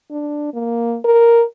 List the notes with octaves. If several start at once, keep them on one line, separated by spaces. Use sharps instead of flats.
D4
A#3
A#4